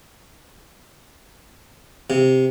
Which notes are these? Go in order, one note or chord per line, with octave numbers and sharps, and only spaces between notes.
C3